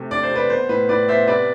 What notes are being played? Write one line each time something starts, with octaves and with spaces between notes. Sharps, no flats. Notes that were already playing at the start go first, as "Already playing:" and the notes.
Already playing: C3 A3
D4 D5
C5
C3 B4 D5
B3 C5
A2 B4
A2 B4 D5
B3 C5 E5
C3 B4 D5